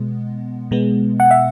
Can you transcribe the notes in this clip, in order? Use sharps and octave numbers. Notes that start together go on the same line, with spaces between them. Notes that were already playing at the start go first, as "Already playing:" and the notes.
Already playing: B2 G#3 B3
B2 G#3 B3
F#5
E5